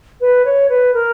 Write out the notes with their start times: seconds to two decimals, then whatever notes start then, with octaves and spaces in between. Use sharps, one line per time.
0.21 B4
0.45 C#5
0.69 B4
0.94 A#4